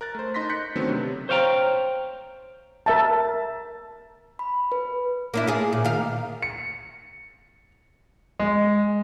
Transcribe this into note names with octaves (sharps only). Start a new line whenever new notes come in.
A#4 F#6 A6
A3 C5
D#4 C6 A#6 B6
F#6 G6 B6 C#7
D3 D#3 F#3 A3 B3 C4
C3
C5 C#5 F5 G5 A#5
A#4 E5 A5
B5
B4
A#3 D4 E4
F4 G#4
A#2
D#3 F5
C#7
G#3